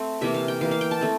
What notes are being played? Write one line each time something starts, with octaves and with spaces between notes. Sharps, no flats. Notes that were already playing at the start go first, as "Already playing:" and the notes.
Already playing: A3 C4
C3 E3 A#3 E5
F5
G5
E3 A#3 F5
F5
G5
A5
A3 C4